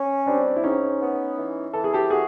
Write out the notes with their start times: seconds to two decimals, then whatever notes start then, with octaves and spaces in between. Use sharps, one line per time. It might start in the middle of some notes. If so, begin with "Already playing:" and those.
Already playing: C#4
0.26 G3 C4 D4
0.56 E4
0.63 G#2 C#4 D#4
1.00 B3
1.38 E3
1.73 E3 A4
1.84 G#4
1.93 G4 A4
2.10 F#4 G#4